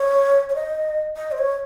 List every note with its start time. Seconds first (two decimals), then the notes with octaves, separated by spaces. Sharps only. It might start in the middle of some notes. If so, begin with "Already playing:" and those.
Already playing: C#5
0.49 C#5
0.55 D#5
1.17 D#5
1.32 C5
1.38 C#5